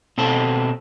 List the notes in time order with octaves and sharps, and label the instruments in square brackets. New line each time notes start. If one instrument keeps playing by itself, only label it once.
[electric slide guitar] B2 C4 A4